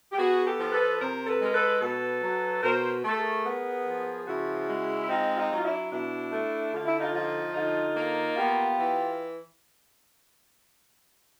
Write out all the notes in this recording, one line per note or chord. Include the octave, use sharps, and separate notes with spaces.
G4
B3 F#4 G#4
G4 A4
F3
A4 B4
C3 A#4 C5
A4 B4
G#3 A#4
A4 B4
B2 A4 B4
F#3
B2 A#4 C5
A3 A4
G#4 A#4
B3
F3
C#3 E4 F#4
G#3
E4
C4 D#4 F4
D#4 F4
F#3
F4
D4 E4
B2 D4 E4
A3
D3 F4
E4
D#4 F4
F3 D#4 F4
D3 D#4 F4
A#3
B3 F4 G4
E3